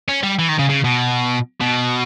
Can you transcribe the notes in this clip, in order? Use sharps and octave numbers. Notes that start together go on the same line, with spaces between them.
C#4
G3
E3
D#3
C#3
C#3
B2
B2